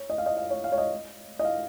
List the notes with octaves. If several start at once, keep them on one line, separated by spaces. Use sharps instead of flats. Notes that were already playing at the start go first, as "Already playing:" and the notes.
Already playing: C#5
D#5
F5
D#5
F5
C#5
F5
C#5
D#5
D#5
F5